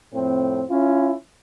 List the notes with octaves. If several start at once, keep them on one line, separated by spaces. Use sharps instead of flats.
F2 A2 C4
C#4 E4 F4